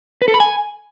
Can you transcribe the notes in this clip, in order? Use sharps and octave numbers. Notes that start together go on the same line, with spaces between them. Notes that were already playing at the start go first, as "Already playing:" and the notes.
B4
A4
B5
G#5